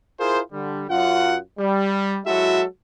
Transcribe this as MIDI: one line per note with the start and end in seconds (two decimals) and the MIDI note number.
0.20 0.41 64
0.20 0.41 65
0.20 0.41 68
0.20 0.41 70
0.20 0.41 72
0.53 0.84 50
0.53 0.84 55
0.90 1.37 42
0.90 1.37 65
0.90 1.37 78
1.59 2.20 55
2.27 2.64 54
2.27 2.64 56
2.27 2.64 64
2.27 2.64 66
2.27 2.64 69
2.27 2.64 76